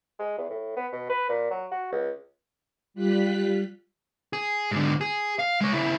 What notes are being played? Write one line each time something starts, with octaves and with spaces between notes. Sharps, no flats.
G#3
E2
A2
B3
B2
B4
A#2
F#3
F#4
C#2
G3 F4 F#6 B6
G#4
G#2 D3
G#4
F5
G#3 C#5
C#3 E4